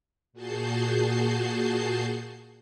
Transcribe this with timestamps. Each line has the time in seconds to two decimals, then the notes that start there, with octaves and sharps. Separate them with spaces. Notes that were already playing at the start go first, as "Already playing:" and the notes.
0.33 A#2 F#4 G#4 A5 G6 C7